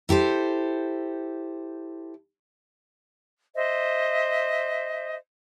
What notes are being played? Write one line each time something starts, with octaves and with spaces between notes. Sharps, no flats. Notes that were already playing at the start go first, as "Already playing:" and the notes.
E4 G4 A4 C5
C5 D#5 E5